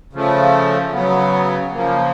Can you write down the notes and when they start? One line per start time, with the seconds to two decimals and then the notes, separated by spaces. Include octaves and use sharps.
0.13 C#3 F3 A3
0.93 C#3 F#3 B3
1.73 C#3 F3 A#3